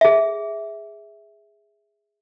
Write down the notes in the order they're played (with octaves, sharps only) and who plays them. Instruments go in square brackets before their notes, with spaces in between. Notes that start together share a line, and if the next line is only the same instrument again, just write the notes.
[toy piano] G#4 E5